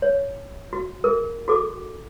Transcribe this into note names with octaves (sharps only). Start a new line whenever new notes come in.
C#5
F#4
G#4 A#4
F#4 G#4 A4 D6